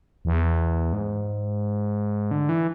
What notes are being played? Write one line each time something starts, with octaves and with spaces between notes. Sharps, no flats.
E2
G#2
D3
E3